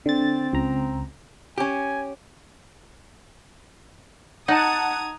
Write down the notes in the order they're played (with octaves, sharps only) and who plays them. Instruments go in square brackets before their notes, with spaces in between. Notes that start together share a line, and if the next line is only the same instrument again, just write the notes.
[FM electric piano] D3 A6 [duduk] C4
[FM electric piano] C#2 A#5
[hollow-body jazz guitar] C#4 G4 [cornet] G#5
[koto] D#4 [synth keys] F#5 A5 [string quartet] A#5 D#6 G#6